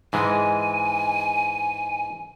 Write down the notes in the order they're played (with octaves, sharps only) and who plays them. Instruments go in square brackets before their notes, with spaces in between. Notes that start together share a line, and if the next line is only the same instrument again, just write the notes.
[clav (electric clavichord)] G#2 E3 G#3 [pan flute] G#5